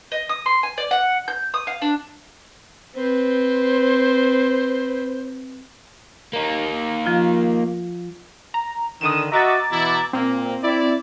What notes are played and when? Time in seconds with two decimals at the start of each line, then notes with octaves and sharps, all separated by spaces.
0.12 D#5
0.29 D#6
0.46 C6
0.63 G#5
0.78 D5
0.91 F#5
1.28 G6
1.54 D#6
1.67 F5
1.82 D4
2.95 C4 B4 C5
6.33 A#3 D#4
7.06 F3 F4
8.54 A#5
9.01 D3 D#3 D#6 D#7 E7
9.32 F#4 D#5 E5 A#5 D6 A6
9.71 B2 E3 E4
10.13 A#2 A#3 C4
10.63 E4 D5